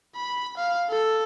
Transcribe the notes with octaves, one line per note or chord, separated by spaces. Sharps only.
B5
F5
A4